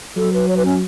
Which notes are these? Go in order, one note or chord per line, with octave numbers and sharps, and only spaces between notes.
F#3 A4
B4
C#5
B4
C#4